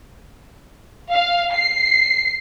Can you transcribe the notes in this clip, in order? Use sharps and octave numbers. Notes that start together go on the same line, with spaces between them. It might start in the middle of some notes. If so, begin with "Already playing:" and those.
F5
C7